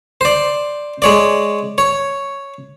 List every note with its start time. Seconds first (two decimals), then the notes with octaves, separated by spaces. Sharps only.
0.21 C5 D5
1.02 G#3 C#5 D5
1.78 C#5